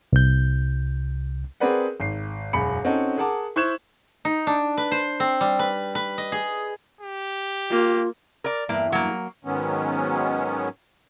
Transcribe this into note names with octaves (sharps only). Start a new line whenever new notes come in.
C2 G6
C4 G#4 A#4 B4 D5 F#5
G#1 C7
E1 F#2 B5 C#7
C4 C#4 D#4 F#4 A4
G#4 A#4 F#5 A5 D6
E4 C5 C#6 F#6 G#6 E7
D#4
D4
B4
C5
C4
G3
B4
B4
D#5
G#4
G4
A#3 F4
A#4 D5
E2 G2 A#3 E4
F#3 A#3
G#2 D#3 F#3 G#3 B3 C#4